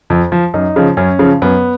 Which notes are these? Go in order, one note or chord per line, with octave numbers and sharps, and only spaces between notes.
F2
F3
F#2 D#4
C#3 F3
F#2 C#4
C#3 F3
F#2 B3